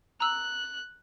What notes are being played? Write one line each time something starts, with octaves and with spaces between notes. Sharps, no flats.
A#5 E6 F#6